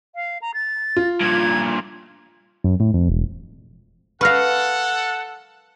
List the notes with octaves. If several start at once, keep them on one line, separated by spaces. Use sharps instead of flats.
F5
A#5
A6
F4
G2 A#2 G#6
F#2
A2
F2
E1
A4 B4 F5 F#5 C#6 F6 A#6